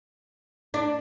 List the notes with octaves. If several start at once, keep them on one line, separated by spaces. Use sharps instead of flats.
D4